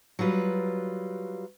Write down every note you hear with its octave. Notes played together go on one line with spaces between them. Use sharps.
F#3 G3 F4 B4